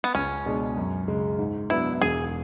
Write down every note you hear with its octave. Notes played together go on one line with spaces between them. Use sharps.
B3
C#2 C#4
B2 G#3 D4 G#4
F#2
C#3 G#3
G#2
F#3 B3 D4 E4
E1 G#4